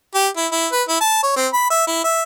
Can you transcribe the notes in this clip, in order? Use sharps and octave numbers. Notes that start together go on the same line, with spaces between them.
G4
E4
E4
B4
E4
A5
C#5
C4
B5
E5
E4
E5